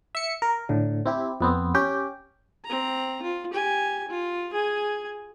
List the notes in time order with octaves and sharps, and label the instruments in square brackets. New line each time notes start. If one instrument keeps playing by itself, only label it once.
[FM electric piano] E5 C#7
A#4
A2 D3
C4 E4 G4
F2 B3 C4
C#4 G4 G5
[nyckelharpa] C4 A#5
F4
G4 G#5
F4
G#4 G#5